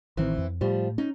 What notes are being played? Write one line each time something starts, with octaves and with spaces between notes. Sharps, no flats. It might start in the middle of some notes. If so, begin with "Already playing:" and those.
A1 D#3 E3 C4
F2
A2 F3 G3
C#4 D#4